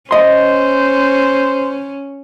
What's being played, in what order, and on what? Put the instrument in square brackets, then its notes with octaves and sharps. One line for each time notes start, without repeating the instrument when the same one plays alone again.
[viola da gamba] C#4 [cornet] C5 [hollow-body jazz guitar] D#5 C6